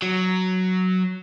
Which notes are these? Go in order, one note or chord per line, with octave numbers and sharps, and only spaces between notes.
F#3